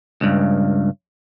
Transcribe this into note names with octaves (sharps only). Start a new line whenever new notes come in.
C#2 G2